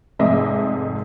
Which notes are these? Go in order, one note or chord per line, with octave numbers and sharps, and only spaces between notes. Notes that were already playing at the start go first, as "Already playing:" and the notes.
F1 F2 G#2 D#5 E5 D6